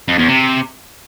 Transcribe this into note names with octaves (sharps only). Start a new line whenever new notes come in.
F2
E2
C3